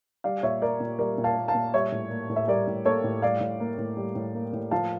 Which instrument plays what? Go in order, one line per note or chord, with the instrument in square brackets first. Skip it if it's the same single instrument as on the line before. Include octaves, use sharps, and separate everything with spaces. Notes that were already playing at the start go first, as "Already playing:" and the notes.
[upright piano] G3 D5 F5
A#2 C#5 E5
A#3 A#4 D5
A#2
G3 A#4 D5
A#2
F5 A5
A#3
F5 A5
A#2
G3 C#5 E5
A2
A#3
A2
E5
G3 A#4 D5
A2
A#3 A4 C#5
A2
G3 D5 F5
A2
A#3
A2
G3
A2
A#3
A2
F3 F5 A5